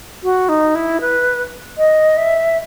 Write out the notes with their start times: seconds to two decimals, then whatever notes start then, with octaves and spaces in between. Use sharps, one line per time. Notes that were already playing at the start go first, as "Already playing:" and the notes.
0.23 F#4
0.49 D#4
0.75 E4
1.00 B4
1.78 D#5
2.17 E5